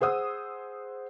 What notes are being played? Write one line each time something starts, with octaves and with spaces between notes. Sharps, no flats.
G#4 C5 F#5 D#6 E6